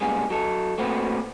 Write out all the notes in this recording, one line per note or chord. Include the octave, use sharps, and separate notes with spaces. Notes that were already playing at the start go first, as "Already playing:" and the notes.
C#2 C#3 G3 A#3 B3 G#4
F#3 A4
A3 A#3 C4 F#4 B4